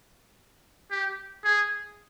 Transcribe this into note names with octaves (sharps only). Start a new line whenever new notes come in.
G4
G#4